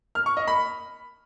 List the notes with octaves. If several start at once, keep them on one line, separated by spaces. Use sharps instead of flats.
F6
C#6
D#5
B5